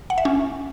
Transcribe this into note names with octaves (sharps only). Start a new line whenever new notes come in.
F#5
E5
C#4